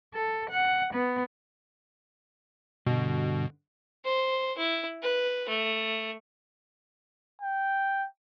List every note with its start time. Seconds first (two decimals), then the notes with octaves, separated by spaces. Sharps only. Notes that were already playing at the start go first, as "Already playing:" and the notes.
0.15 A4
0.50 F#5
0.94 B3
2.86 G2 B2 D3
4.05 C5
4.57 E4
5.02 B4
5.49 A3
7.41 G5